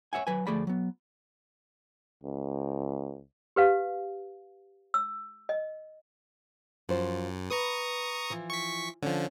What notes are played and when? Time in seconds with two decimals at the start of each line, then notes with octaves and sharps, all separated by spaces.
0.13 C#5 E5 F#5 G#5
0.27 F#3 B4 G#5
0.47 D2 F3 A3 G#4 D5 B5
0.67 F#3 B3
2.23 C#2
3.56 G4 B4 F5
4.94 E6
5.49 D#5
6.89 F#2 F3 C5
7.50 B4 A#5 C#6 D#6
8.30 E3 F3
8.50 C#6 B6
9.03 D3 F3 C#4